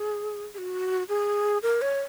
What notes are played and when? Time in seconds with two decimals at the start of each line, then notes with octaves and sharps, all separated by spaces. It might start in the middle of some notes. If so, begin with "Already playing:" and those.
Already playing: G#4
0.54 G#4
0.58 F#4
1.09 G#4
1.63 A#4
1.82 C#5